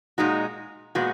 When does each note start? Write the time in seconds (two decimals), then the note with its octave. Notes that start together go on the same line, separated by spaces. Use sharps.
0.18 A#2 G#3 D#4 F#4
0.95 A#2 G#3 B3 F#4